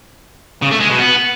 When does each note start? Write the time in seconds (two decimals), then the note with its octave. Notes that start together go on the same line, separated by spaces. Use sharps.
0.62 C#3
0.71 A3
0.80 G#3
0.90 B2
0.99 B3